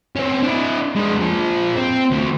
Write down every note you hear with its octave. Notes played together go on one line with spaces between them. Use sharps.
C4 C#4
D4 E4
G#3 D4
A#2 F3
C4
D2